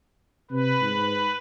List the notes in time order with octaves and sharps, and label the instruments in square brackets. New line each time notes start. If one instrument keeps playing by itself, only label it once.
[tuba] C3 [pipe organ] B4
[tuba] G#2